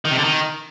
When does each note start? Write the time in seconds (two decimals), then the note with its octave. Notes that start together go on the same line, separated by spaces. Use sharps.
0.05 D#3
0.11 C3
0.18 D3
0.24 D#3